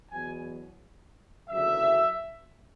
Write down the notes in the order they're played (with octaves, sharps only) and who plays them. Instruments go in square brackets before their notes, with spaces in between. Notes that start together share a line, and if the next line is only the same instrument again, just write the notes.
[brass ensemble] E2 B2 F#3 G#5
F#1 E2 D3 F#3 E5